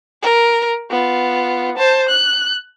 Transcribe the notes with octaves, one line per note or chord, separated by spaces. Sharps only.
A#4
B3 F4
C5 A5
F#6